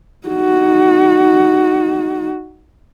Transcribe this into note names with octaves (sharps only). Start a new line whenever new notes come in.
D#4 F#4